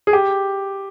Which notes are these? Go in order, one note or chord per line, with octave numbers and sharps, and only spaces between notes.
G#4
G4